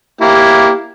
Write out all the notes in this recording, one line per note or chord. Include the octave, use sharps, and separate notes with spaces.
A#3 E4 G4